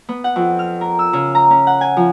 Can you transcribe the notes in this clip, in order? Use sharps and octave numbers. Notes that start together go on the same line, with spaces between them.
B3
F#5
F2
F6
A#4
E6
C#3
A#5
C#4
F#5
G#5
F3